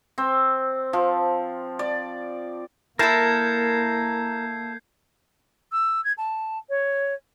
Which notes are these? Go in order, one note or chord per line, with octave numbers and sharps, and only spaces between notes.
C4
F3
D5
A#3 E4 A4 A#4 A5 G6 G#6 C7
E6
G#6
A5
C#5